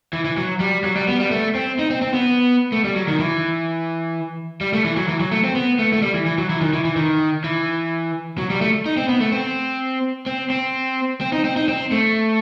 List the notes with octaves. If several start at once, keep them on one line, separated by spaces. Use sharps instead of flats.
E3
E3
F#3
G3
F#3
G3
B3
G3
A3
C4
D#4
C4
C4
B3
A3
G3
F#3
D#3
E3
G3
A3
E3
F#3
E3
F#3
A3
C4
B3
A3
A3
G3
E3
E3
F#3
E3
D#3
E3
E3
D#3
E3
F#3
G3
A3
D#4
C4
B3
A3
C4
C4
C4
C4
D#4
C4
D#4
C4
A3